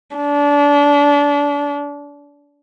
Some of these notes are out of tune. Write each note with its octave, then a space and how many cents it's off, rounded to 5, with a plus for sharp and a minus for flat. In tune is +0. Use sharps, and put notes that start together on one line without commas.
D4 -30